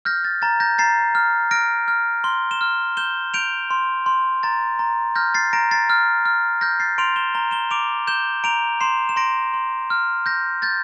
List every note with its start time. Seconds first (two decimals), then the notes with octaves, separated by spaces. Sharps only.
0.05 F6 G6 A#6
0.24 A6
0.42 A#5 A6
0.60 G6 A#6
0.78 A#5 A6 C7
1.15 F6
1.51 F6 A#6 D7
1.88 F6
2.24 C6 G7
2.51 E7 G7
2.61 F6
2.97 G6 E7 G7
3.34 G6 D7 F7
3.71 C6
4.06 C6
4.43 A#5 A6
4.79 A#5
5.15 F6 G6 A#6
5.34 A6 C7
5.53 A#5 A#6 D7
5.71 A6 C7
5.90 F6
6.25 F6
6.61 F6 G6 A#6
6.80 A6 C7
6.98 C6 D7 F7
7.16 E7 G7
7.35 A#5 G7
7.51 E7 G7
7.71 D6 D7 F7
8.07 G6 E7 G7
8.44 A#5 D7 F7
8.81 C6 C7 E7
9.09 E7
9.16 C6 A#6 D7
9.54 C6
9.90 F6
10.26 G6 A#6
10.62 G6 A6